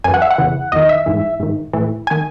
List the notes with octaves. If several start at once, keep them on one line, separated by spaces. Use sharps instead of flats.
F#2 E3 G#5
F#5
E5
F#5
E2 C#3 E3
E2 D#3 D#5
E5
G#2 E3
G#2 D#3
A2 E3
D#3 G#5